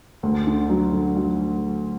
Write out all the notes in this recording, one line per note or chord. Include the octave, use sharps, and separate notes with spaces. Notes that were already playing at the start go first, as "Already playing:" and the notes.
D2
D3
F#3
D3
F#3